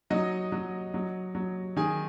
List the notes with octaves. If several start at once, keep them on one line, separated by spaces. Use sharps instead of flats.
F#3 D#4 D#5
F#3
F#3
F#3
D#3 G#4 G#5